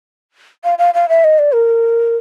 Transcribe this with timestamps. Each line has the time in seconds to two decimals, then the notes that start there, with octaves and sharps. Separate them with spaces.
0.64 F5
0.78 F5
0.94 F5
1.09 E5
1.24 D#5
1.39 D5
1.54 A#4